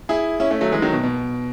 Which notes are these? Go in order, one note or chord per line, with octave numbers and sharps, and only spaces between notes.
E4 G#4
C#4 E4
A3 C#4
F#3 A3
E3 G#3
D#3 F#3
B2
B2